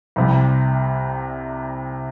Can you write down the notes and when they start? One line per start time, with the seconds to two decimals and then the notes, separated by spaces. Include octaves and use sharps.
0.16 C2 C3 G3